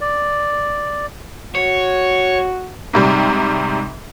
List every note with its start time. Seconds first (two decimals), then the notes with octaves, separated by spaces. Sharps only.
0.01 D5
1.55 F#4 C#5
2.93 G#2 C3 G3